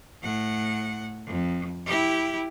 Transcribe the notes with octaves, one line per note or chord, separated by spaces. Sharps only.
A2 F#5
F2
E4 G4